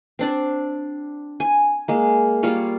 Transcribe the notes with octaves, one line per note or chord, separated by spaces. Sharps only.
C4 D4 D5
G#5
G#3 A#3
G3 A#3 F4 C#5